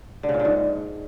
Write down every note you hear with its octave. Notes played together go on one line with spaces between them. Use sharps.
D3
C#3
A#2
D3
G#2